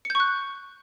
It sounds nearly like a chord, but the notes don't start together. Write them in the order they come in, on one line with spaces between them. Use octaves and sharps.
C#7 G6 C#6 F#6